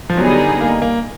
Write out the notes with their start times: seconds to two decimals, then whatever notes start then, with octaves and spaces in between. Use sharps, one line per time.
0.10 F3
0.17 D3 F#3 G3 B3 D#4 G#4
0.61 A#3
0.82 A#3